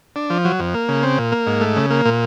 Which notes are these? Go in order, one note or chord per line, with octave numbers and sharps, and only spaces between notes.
D4
F3
F#3
F2
A#3
C#3
C4
A#2
A#3
G#2
A3
C#3
A#3
A#2